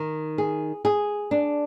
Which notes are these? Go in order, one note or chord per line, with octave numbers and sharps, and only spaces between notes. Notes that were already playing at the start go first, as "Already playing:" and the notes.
Already playing: D#3
G#4
G#4
D4